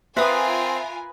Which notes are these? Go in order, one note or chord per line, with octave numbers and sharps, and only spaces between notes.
C4 F4 A#4 B4 E5 G#5 D#6